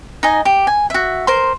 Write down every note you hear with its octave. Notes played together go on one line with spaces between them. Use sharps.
D#4 D#5 G#5
G4
G#5
F#4 E5
A#4 C5 C6